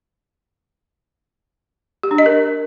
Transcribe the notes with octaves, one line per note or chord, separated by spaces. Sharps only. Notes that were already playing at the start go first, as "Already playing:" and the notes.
G4
D4
D#5
A#4